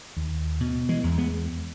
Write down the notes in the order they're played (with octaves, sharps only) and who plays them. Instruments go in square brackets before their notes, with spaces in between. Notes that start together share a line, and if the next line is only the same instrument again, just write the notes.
[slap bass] D#2
B2
E3 G#3
E2
G#3 B3